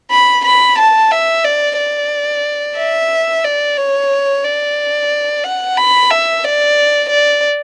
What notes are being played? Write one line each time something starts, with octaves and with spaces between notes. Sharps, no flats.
B5
B5
A5
E5
D5
D5
E5
D5
C#5
D5
F#5
B5
E5
D5
D5